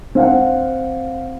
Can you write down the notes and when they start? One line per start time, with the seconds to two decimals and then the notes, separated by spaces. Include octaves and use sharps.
0.15 C4 F5 F#5